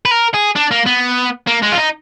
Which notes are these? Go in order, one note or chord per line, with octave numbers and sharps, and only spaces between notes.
B4
A#4
G#4
D4
A#3
B3
A#3
G#3
F4
D#4